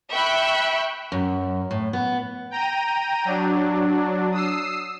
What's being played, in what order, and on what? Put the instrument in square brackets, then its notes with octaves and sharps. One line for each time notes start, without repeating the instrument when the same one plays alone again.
[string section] E5 G5 B5 C#6 F#6
[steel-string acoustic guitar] F#2
A2
B3
[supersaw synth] G5 A#5 D#7
F#3 D4
D#6 E6 C7